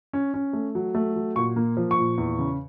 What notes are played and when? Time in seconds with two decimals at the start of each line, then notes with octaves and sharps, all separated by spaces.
0.13 C#4
0.34 C#4
0.53 A3
0.75 F#3
0.95 A3
1.16 F#3
1.36 A#2 C#6
1.56 A#3
1.77 F3
1.91 C#6
1.98 A#2
2.18 E2
2.39 C#3